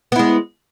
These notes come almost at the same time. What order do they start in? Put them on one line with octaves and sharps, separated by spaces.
B3 E4 G#3